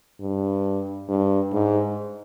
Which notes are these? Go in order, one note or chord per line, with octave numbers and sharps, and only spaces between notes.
G2
G2
G#2